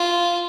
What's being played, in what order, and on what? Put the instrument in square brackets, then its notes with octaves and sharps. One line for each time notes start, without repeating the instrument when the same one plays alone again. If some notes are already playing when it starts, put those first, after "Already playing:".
Already playing: [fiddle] F4